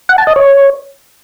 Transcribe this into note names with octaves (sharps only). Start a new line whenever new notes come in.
F#5
A5
D#5
C#5